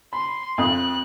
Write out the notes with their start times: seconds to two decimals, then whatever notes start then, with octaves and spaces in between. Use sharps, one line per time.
0.13 B5 C6
0.58 F2 D#6 F#6